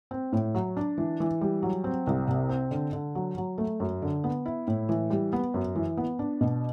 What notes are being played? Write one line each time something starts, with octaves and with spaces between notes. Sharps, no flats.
C4
A2
F#3
D4
E3
E3
G3
F#3
C4
C2
C3
C4
D3
D3
F#3
F#3
A3
F#2
D3
B3
E4
A2
E3
G3
B3
F#2
E3
B3
D4
B2